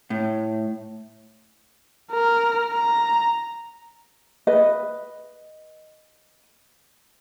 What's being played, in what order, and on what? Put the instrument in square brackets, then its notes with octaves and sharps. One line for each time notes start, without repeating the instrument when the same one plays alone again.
[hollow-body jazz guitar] A2
[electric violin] A#4
A#5
[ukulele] B4 D#5